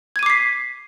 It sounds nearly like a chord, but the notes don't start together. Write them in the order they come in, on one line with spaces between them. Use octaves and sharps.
G#6 D#7 D6 C7 B6